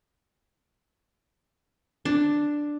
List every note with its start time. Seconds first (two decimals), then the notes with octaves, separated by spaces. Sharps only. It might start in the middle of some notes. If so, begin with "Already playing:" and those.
2.05 D4